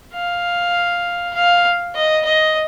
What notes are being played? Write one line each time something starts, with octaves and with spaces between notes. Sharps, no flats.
F5
F5
D#5
D#5